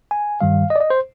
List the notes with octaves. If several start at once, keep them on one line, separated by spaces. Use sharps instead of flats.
G#5
G2 D#3 G3 F5
D#5
D5
D#5
C5